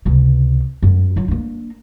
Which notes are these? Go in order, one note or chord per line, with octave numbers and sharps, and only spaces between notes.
C#2 C3
F#2
F#3 F4
A#3 D4